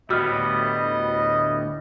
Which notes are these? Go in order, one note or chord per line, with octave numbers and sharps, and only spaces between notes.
D2 A2 G3 B3 F#4 D#5 E6 F6